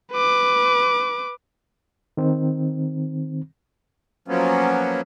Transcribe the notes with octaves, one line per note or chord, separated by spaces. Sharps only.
B4 D6
D#3 C4
F3 F#3 A#3 B3 C#4